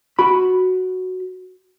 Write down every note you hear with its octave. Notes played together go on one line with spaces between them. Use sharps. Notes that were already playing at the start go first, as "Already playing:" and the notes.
F#4 B5